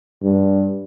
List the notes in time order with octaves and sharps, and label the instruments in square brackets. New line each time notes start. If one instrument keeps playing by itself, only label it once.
[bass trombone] G2